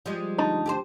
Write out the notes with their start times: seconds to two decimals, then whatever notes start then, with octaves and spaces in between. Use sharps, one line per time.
0.06 F3 G3 G#3
0.38 D2 D4 D#4 A5
0.66 G4 G#4 C5